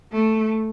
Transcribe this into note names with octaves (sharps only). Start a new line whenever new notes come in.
A3